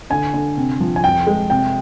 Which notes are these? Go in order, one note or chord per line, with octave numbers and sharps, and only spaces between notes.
D3 G#5
D3
C3
F3
G#5
F2 G5
G#3
C3 G5